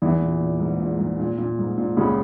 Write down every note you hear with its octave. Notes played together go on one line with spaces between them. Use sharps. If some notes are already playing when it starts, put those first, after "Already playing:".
E2 E3
A#2
A#2
G#2
A#2
G#2
A#2
A#2
G#2
A#2
C#2 C#3